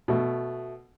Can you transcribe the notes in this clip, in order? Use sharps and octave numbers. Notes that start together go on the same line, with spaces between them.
B2 A3